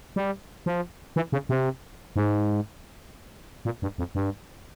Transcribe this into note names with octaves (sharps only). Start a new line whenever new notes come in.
G3
F3
E3
C#3
C3
G#2
A#2
G2
F2
G2